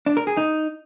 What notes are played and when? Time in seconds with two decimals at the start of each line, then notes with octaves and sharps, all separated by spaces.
0.06 D4
0.17 A#4
0.27 G#4
0.37 D#4